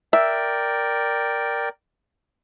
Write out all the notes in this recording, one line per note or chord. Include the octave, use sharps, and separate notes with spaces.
A#4 D5 E5 G5